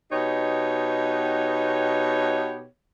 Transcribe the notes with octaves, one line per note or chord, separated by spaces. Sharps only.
B2 B3 D#4 G4 C#5